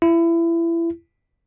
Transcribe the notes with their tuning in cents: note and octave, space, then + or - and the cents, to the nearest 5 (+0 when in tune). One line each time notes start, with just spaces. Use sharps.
E4 +25